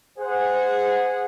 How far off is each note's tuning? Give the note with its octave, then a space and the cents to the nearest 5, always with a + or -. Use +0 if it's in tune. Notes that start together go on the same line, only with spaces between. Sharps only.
G#4 -15 C5 -25 F#5 -20